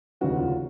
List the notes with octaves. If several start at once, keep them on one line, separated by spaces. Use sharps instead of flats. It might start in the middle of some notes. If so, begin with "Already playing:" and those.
F1 D#2 C#3 E3 F#4
F4